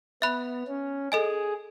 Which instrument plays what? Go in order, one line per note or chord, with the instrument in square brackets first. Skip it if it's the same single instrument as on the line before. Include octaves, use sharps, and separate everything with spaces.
[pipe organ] B3 [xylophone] E5 B5 F#6
[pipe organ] C#4
[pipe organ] G#4 [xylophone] A4 D#5 G#5